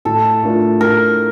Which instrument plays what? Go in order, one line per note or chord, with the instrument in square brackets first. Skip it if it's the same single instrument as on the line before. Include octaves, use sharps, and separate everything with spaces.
[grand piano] A2 [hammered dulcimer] A4
[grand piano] A3 D4 F4 A#4
[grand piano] A2 [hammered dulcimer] A#4